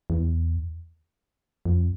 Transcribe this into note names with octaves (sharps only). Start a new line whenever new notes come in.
E2
F2